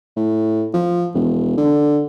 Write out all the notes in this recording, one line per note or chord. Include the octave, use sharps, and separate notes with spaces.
A2
F3
E1
D3